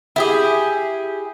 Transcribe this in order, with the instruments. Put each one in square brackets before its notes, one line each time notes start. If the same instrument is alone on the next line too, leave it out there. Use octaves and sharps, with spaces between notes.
[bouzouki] E4 G4 G#4